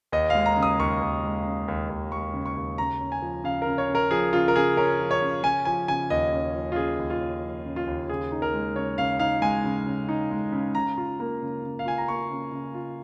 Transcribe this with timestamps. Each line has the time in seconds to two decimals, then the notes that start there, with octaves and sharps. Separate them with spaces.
0.12 D#2 D#5
0.30 F5
0.35 G#3
0.46 A#5
0.57 C#3
0.63 D#6
0.80 D#2 C#6
1.01 D#2
1.24 G#3
1.45 C#3
1.68 D#2
1.90 D#2
2.12 G#3 C#6
2.34 C#3
2.46 C#6
2.57 D#2
2.78 C#3 A#5
3.01 C#4
3.12 G#5
3.22 F3
3.44 C#3 F5
3.62 C#3 A#4
3.78 C#5
3.89 C#4
3.95 A#4
4.11 F3 G#4
4.33 C#3 F4
4.48 A#4
4.55 C#3 G#4
4.77 C#4 A#4
4.99 F3
5.11 C#5
5.22 C#3
5.43 C#4 G#5
5.65 F3 G#5
5.88 C#3 G#5
6.10 D#2 D#5
6.33 C#4
6.54 F3
6.72 F4
6.76 C#3 G#4
6.99 D#2
7.10 F4
7.21 C#4
7.44 F3
7.66 C#3
7.76 F4
7.87 D#2
8.10 C#3 G#4
8.32 D#4
8.42 A#4
8.54 G#3
8.75 C#3 C#5
8.98 C#3 F5
9.19 D#4 F5
9.42 G#3 G#5
9.64 C#3
9.86 C#3
10.09 D#4
10.31 G#3
10.52 C#3
10.74 C#3 A#5
10.97 F4
11.20 A#3
11.42 C#3
11.63 C#3
11.79 F5
11.86 F4 G#5
11.98 A#5
12.08 A#3 C#6
12.30 C#3
12.52 C#3
12.74 F4